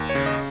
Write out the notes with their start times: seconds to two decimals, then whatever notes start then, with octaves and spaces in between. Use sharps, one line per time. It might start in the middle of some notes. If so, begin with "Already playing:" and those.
Already playing: D#2
0.09 C#5
0.15 C#3
0.26 D#5